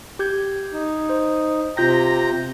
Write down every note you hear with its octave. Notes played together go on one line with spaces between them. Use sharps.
G4 G6 G#6
D#4
C5
C3 F4 G5 A#5 G6 A#6